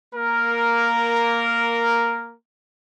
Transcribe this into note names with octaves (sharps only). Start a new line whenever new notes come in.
A#3 A#4